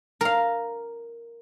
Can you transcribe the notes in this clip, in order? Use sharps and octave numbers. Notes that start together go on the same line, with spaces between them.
A#4 F5